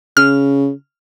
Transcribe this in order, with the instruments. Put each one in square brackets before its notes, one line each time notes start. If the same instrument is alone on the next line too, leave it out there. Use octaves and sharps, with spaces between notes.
[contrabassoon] C#3 [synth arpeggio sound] F6